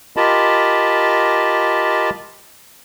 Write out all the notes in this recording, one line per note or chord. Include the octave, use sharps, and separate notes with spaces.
F4 G4 A#4 D#5 A5 B5